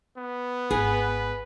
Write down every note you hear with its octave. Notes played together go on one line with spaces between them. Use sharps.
B3
G#1 G#4 B4